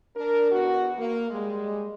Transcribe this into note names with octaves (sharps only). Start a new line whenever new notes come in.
D4 A#4
E2 B3 F#4
A#3
G3 G#3